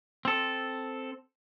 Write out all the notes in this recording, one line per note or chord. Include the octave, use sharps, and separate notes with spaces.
C4 A4